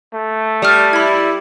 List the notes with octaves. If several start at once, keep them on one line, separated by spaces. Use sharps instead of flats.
A3
G3 A5 D#6 F6
E4 B5 G#6